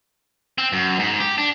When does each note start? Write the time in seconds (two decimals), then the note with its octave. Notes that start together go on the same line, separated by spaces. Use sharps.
0.58 C4
0.73 F#2
0.99 G#2
1.20 G4
1.38 D4